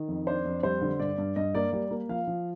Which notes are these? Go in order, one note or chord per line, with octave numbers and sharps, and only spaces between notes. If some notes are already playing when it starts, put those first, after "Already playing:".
Already playing: D#3
F2
D4 C5
F2
G3 C5
D3
G2 D5
G2
G2 D#5
A#3 D5
G3 D5
A#3
F3 F5
F3